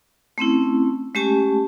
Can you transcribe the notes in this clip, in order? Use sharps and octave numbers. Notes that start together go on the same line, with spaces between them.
A3 C4 C#4 E4
G#3 A3 C#4 G4 G#5 A5